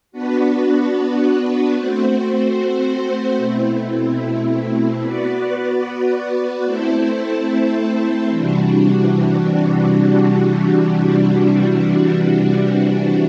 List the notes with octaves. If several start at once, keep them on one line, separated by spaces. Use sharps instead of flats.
B3 D4 F#4 B4
A3 C4 F#4 C5
B2 A3 C4 E4
B3 F#4 B4 D5
A3 C4 E4 A4 C5
C3 E3 G3 D4 F#4